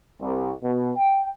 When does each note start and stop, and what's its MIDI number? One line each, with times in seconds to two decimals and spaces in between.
0.21 0.51 36
0.63 0.91 47
0.97 1.29 79